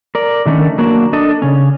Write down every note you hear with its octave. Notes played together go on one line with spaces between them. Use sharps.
A#4 D5
D3 D#3 A3 C4 C#4
F#3 A#3 D4 F#4
D4 A4 D#5
C#3 C#4